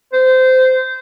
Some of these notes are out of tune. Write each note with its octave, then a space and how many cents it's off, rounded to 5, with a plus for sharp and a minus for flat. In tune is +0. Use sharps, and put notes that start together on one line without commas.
C5 -20